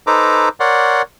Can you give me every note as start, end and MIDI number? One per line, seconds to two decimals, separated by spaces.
0.07 0.49 63
0.07 0.49 69
0.07 0.49 71
0.07 0.49 72
0.07 0.49 82
0.07 0.49 86
0.60 1.02 70
0.60 1.02 73
0.60 1.02 74
0.60 1.02 78
0.60 1.02 84